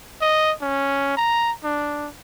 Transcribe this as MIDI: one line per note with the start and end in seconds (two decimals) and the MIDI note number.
0.21 0.52 75
0.61 1.17 61
1.17 1.51 82
1.64 2.08 62